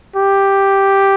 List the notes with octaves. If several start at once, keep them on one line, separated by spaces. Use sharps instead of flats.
G4